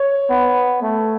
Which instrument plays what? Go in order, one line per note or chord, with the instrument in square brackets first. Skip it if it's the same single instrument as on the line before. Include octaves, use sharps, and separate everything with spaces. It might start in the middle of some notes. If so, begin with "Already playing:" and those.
Already playing: [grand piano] C#5
[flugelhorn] B3
A3